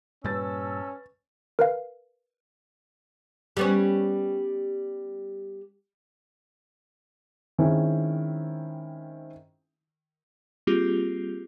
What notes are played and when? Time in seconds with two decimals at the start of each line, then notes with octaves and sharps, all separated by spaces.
0.24 G2 A#2 G3 C#4 B4 A5 E6 A6
1.59 A#4 B4 F5
3.57 G3 B3 C#4
7.58 D#3 G#3 C4 C#4 E4
10.67 G3 A#3 C4 F4 G4 G#4